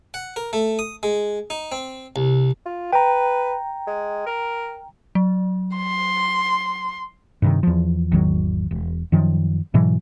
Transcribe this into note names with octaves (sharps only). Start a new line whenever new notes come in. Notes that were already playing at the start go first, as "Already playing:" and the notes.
F#5
A#4
A3
D#6
G#3
D#4
C4
C2
F4
B4 G5 A#5
G#3
A#4
F#3
C6
G2 C3 D#3
E2 F3
G#1 E2 D#3 F#3
E1
F#2 D#3 F3
G#2 B2 E3 F#3